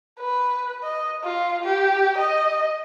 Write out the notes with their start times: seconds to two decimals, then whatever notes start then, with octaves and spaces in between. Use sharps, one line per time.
0.20 B4
0.83 D#5
1.24 F4
1.65 G4
2.18 D#5